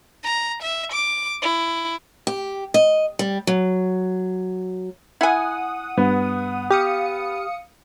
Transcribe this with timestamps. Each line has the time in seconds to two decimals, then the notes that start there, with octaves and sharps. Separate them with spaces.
0.24 A#5
0.63 E5
0.92 D6
1.42 E4
2.27 G4
2.74 D#5
3.19 G3
3.47 F#3
5.21 E4 F#5 G#5 D#6
5.98 G2 B3
6.71 G4 F5 D#6 C#7